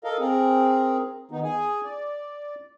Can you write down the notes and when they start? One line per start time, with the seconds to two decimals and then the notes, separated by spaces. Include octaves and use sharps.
0.04 A4 A#4 D#5 F5
0.19 C4 G#4 A#4
1.31 D#3 B3 D#4
1.44 G#4 G#5
1.84 D5